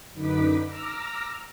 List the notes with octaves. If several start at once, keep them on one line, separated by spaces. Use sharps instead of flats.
F#2 D3 D#4 B4 D6 B6
A#5 D6 E6 F6 A#6